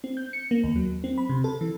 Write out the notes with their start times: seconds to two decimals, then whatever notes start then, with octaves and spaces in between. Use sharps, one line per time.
0.04 C4
0.17 G6
0.33 C#7
0.51 A#3
0.64 D#2
0.76 F#3
1.04 C4
1.18 B5
1.29 C3
1.44 A4
1.61 E3